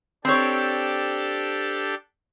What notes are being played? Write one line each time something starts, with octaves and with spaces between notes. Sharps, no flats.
C4 D4 G4 A4 C#5